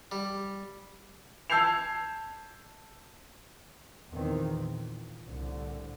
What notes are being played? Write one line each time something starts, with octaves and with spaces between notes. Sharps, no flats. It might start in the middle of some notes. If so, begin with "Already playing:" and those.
G3
A5 E6 G6 G#6 C7 F7
E2 A#2 D#3 E3 C4
A#2
C2 A2 D3